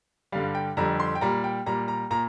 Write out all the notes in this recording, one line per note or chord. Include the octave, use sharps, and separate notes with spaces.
G2 D3 G3 F5
G5
F2 D3 G3 A#5
C6
G5
A#2 G3 A#5
G5
A#2 G3 A#5
A#5
A#2 A#5